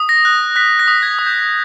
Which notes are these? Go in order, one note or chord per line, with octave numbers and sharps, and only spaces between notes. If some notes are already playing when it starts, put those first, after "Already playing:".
Already playing: D#6
A#6
F#6
F#6 B6
A#6
D#6
G#6
D#6
G6